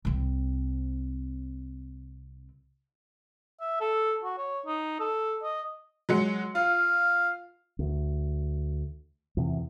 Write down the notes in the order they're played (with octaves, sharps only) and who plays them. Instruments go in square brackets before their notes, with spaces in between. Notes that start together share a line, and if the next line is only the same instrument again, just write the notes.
[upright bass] C2 C4
[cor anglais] E5
A4
F#4
C#5
D#4
A4
D#5
[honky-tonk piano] F#3 G#3 C#7
[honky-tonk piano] F4 [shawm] F5
[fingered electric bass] D2
E2 C3